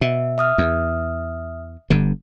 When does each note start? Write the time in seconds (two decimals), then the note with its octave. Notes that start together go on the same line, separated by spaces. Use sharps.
0.01 B2 E5
0.38 E5 D#6 F6
0.58 E2
1.90 G1 G2 D3